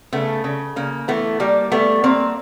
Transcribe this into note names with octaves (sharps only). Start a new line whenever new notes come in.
C#3 A3 B3
C#3
C#3 A#3
E3 A3 B3
G3 A#3
G3 A3 B3
G3 A#3 C4